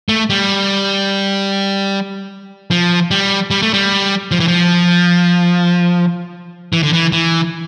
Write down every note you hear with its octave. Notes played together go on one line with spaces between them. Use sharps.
A3
G3
F3
G3
G3
A3
G3
F3
E3
F3
E3
D3
E3
E3